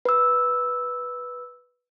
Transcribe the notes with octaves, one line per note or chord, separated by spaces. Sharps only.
B4 E6